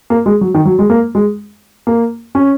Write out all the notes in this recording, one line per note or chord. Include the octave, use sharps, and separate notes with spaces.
A#3
G#3
F#3
D#3
F#3
G#3
A#3
G#3
A#3
C#4